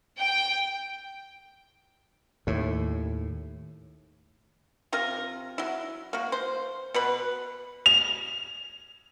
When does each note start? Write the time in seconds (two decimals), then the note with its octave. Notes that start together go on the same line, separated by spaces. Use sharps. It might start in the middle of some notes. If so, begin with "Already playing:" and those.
0.19 G5
2.47 D#2 A2
4.93 C3 F4 A#4
5.58 F#3 E4
6.13 A#3 F#4
6.32 C5
6.94 B2 B4 B5
7.86 F7